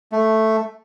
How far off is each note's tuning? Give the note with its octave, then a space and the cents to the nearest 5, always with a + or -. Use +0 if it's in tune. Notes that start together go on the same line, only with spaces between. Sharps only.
A3 +0